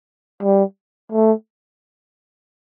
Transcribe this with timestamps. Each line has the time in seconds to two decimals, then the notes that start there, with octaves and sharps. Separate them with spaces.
0.43 G3
1.12 A3